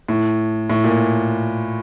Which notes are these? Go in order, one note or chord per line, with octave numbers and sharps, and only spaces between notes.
A2
A2
A#2